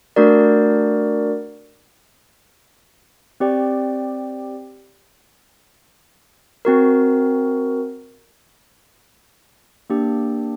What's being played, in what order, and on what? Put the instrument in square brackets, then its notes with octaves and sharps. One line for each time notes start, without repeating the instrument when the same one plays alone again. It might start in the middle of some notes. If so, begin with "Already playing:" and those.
[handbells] A3 D4 F#4 A#4 D5
C4 G4 D5 G5
C4 F#4 A#4
A#3 D4 G4